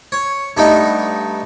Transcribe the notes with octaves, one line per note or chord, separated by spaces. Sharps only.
C#5
G2 A3 B3 D#4